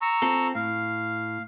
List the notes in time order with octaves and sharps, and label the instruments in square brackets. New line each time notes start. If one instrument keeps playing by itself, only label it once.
[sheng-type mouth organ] A#5 C#6 E6
[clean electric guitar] C4 F4 A4
[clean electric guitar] A2 [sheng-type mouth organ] F5